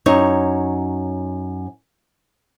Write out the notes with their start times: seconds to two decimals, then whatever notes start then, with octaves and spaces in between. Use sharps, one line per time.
0.06 F#2 D#4 C#5